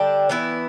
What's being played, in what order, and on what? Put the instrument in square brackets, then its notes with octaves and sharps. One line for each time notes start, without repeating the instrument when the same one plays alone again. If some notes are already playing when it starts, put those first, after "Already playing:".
Already playing: [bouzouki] D3 G3 D4 G5
E3 B3 E4